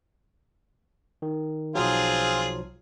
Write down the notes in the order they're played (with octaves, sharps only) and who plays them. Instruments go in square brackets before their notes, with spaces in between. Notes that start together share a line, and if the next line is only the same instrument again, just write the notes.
[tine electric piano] D#3
[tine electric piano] B1 F3 F#3 [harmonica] C4 F4 G#4